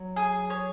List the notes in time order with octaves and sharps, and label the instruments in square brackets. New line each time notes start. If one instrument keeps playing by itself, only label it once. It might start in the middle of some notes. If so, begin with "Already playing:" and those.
Already playing: [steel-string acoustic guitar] F#3
[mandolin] G#4
C#5